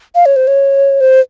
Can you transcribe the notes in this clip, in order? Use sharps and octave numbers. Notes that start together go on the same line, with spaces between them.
F5
C#5
C5
C#5
C5